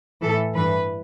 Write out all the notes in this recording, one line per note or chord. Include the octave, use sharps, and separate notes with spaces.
A2 E3 A4
G2 E3 B4